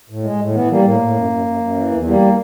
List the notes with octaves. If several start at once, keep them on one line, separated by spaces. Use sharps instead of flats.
A2
G#3
A2
E3 B3
G3 A#3
A2 A#3
A2
F#2
F#2
F#2
F#2
E3
E2
G3 A#3